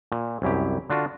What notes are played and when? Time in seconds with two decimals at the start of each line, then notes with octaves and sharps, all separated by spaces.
0.12 A#2
0.42 C2 F#2 E4 G4
0.90 D3 D4 F4 F#4